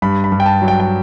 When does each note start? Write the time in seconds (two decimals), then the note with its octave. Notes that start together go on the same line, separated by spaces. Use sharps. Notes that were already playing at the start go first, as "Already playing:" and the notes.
0.02 G2 B5
0.24 B5
0.32 G2
0.40 G5
0.46 A5
0.62 F#3
0.68 G5
0.80 G5